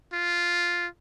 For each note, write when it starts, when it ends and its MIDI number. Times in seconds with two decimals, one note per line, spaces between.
0.13 0.87 65